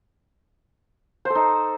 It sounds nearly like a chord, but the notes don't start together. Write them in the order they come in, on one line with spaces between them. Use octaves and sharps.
C5 A4 D#4